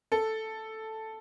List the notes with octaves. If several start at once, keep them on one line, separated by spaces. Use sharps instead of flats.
A4